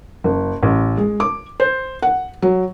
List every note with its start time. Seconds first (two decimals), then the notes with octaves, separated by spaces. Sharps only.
0.24 F#1
0.63 A1
0.98 G#3
1.20 D6
1.60 C5
2.02 F#5
2.42 F#3